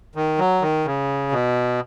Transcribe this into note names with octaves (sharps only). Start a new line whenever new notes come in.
D#3
F#3
D#3
C#3
B2